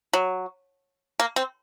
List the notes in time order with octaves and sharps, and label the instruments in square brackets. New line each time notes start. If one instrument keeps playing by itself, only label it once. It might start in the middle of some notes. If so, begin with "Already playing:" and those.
[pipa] F#3
A#3
C4